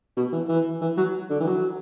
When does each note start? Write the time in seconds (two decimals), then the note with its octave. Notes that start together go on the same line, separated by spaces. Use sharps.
0.17 B2
0.33 E3
0.49 E3
0.81 E3
0.97 F#3
1.30 D3
1.40 E3
1.46 F#3